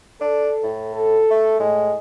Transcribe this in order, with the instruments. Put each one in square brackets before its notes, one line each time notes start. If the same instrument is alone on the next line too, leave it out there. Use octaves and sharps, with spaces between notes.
[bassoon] D4 [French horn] A4
[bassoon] A2
[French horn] A4
[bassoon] A3
[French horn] A2 [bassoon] G#3